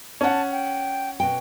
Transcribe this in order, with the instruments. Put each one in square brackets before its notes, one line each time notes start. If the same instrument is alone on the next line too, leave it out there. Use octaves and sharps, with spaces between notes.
[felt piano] C#4 F#5 [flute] A5
[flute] G5
[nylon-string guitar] B2 G5